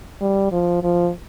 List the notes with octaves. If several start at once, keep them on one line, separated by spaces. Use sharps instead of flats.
G3
F3
F3